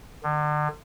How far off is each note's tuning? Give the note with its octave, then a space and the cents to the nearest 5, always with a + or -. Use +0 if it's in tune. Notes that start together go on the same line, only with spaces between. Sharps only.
D3 +40